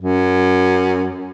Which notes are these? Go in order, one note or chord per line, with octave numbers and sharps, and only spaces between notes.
F#2